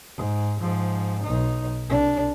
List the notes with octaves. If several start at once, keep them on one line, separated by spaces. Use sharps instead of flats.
G#2
G#2 F3
B1 D#4
C2 D4